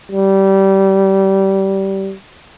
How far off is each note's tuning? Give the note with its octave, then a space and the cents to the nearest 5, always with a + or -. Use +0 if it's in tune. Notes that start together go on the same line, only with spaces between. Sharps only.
G3 -20